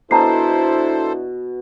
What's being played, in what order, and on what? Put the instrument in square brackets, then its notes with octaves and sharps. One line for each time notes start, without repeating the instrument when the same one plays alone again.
[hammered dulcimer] B2 [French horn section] D4 E4 [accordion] A4 C5 [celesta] A5 A#5 C7